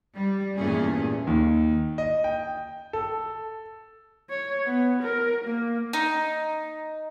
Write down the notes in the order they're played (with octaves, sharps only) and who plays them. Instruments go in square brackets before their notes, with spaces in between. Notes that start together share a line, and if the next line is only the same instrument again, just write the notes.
[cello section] G3
E2 G2 A#2 A3 C#4 G#4
[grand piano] D#2
D#5
G5
A4
[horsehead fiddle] C#5
B3
A#4
A#3
[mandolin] D#4